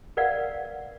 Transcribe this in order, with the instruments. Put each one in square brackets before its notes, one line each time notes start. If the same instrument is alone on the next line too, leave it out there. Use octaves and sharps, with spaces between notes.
[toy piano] A#4 B4 D5 F5 F#5